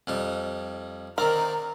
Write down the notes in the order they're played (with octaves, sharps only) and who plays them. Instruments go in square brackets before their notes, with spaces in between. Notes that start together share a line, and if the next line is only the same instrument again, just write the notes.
[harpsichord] F2 G3 D#4
[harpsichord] D#3 C4 D5 [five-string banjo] A#4 [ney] A#5